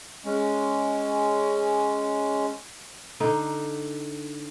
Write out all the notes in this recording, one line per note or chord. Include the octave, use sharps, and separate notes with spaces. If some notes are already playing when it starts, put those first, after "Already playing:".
G#3 C#4
D3 D#4